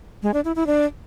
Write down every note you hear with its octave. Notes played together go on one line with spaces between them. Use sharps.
G#3
D4
E4
E4
D4